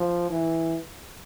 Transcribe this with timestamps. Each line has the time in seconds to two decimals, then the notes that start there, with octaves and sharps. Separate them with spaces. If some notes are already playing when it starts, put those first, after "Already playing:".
Already playing: F3
0.30 E3